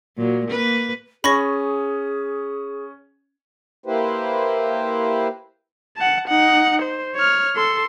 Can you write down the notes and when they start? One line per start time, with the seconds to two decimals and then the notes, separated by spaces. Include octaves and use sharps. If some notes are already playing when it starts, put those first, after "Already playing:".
0.17 A#2 F#3
0.47 A#3 B4
1.24 C#4 G#4 B5 C#6 A#6
3.86 A#3 E4 G4 B4 C5
5.97 F#5 A5
6.28 D#4 F#5
6.82 C5
7.16 C#5 F6
7.56 A4 C6